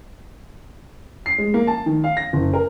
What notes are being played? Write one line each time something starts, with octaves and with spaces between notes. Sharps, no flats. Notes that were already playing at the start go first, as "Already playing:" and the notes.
C7
G#3
A#3
A5
D#3
F5
A#6
F#1
A#4